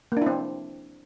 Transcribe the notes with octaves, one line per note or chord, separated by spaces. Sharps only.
A#3 C4 D4 E4